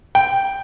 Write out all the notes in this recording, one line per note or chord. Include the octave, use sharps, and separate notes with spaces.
G5